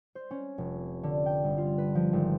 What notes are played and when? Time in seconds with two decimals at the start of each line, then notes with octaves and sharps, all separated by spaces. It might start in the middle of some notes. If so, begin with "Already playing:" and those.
0.15 C5
0.31 C#4
0.58 F1
1.03 D3
1.26 G5
1.44 G1
1.58 F4
1.78 B4
1.95 F3
2.13 G#1